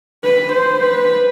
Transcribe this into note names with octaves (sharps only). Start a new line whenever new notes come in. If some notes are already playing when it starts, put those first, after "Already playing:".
B4
C5
B4